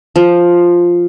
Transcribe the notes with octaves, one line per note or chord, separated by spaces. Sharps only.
F3